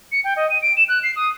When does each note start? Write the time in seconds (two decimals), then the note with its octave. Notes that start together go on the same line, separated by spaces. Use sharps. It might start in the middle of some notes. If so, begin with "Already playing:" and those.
0.12 C#7
0.24 G5
0.36 D#5
0.50 D#7
0.62 D7
0.76 E7
0.88 F#6
1.03 C7
1.16 D#6